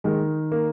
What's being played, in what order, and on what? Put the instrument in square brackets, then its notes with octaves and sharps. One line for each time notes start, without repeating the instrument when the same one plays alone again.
[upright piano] D#3 G#3
A#3